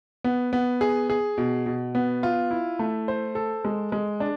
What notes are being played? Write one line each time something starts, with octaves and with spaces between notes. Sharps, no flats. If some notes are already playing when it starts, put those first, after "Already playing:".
B3
B3
G#4
G#4
B2
B2
B3
F4
E4
A3
C5
A4
G#3
G#3
D4